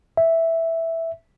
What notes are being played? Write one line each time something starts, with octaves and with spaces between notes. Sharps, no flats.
E5